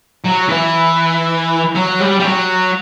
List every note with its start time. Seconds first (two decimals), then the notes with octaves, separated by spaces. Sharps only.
0.24 F#3
0.48 E3
1.75 F#3
2.00 G3
2.20 G3
2.24 F#3